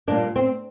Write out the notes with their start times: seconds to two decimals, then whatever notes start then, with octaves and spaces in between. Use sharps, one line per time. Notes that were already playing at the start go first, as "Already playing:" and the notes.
0.07 A#2 G3 A#3 D4
0.36 C4